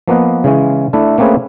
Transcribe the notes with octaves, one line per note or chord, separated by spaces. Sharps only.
F3 A#3 B3 B4 D#5
C#3 E3 G#3 C#4
A3 D4 E4
A3 A#3 C4 C#4 G#4 B4